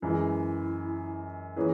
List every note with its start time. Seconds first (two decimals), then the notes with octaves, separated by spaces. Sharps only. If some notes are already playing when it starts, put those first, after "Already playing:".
0.02 F#2 E3 G#3 E4
1.56 E3 A#3 C#4 E4 G#4 B4